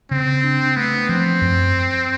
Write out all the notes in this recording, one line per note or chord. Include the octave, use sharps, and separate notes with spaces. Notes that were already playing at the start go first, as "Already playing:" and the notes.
C#3 C4
D4
A3 B3
F3 C4
F#2